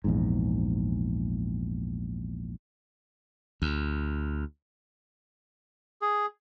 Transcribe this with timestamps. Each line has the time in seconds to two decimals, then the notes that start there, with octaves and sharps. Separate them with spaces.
0.04 A#1 E2 G#2
3.62 D2
6.02 G#4